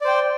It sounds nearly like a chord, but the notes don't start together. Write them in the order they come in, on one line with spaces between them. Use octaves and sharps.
D5 C5 G5